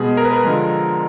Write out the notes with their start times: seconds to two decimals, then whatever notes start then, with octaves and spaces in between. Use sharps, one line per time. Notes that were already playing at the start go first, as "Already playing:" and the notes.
Already playing: B2 G#3 G#4
0.17 A#4
0.25 B4
0.33 A#4
0.44 D3 F3 G#3